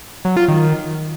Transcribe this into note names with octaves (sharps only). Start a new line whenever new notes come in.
F#3
F4
D#3